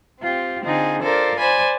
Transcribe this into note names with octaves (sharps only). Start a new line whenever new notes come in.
C4 F4 G4
D3 C4 D#4 F4 G#4
F4 A4 A#4 C5 D5
C5 D5 G#5 B5